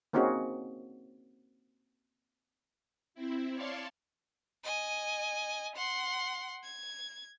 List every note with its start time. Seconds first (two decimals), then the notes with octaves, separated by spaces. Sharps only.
0.13 A#3 C4 C#4 D#4 F#4 G#4
3.14 C4 E4
3.54 C#5 D5 F5 A5 C6 C#6
4.64 D#5 G#5
5.75 F#5 C6
6.63 G#6